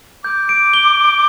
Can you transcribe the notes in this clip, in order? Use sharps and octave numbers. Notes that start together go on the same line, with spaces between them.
D6 G6
D7
G7